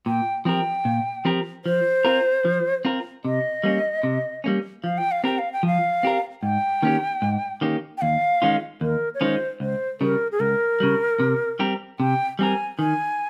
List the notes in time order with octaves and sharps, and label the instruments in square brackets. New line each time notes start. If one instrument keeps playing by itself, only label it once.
[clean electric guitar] A#2 [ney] G5
[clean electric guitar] F3 C4 G4 A#4 [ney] G5
[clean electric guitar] A#2
F3 C4 G4 A#4
[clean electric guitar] F3 [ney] C5
[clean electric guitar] C4 F4 A#4
F3
C4 F4 A#4
[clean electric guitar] C3 [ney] D#5
[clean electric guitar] G3 A#3 C#4
C3
G3 A#3 C#4
[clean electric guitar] F3 [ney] F5
[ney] G5
F5
[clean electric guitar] C4 G4 A#4 [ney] G5
[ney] F5
G5
[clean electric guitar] F3 [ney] F5
[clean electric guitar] C4 G4 A#4
[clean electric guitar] G#2 [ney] G5
[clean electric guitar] D#3 A#3 C#4 G4
G#2
D#3 A#3 C#4 G4
[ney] G5
[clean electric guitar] D#2 [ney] F5
[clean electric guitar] D#3 G#3 C#4 F4
[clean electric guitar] D#2 [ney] A#4
[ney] C#5
[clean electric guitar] D#3 G#3 C#4 F4 [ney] C5
[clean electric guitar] C#2 [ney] C5
[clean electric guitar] C#3 G3 [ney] A#4
[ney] G#4
[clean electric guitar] C#2 [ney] A#4
[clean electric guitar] C#3 G3
C3
G3 C4 G4 A#4
[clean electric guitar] C3 [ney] G5
[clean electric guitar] G3 C4 G4 A#4 [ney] G#5
[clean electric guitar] D#3 [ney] G#5